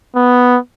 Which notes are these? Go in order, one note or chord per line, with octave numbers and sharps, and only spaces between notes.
B3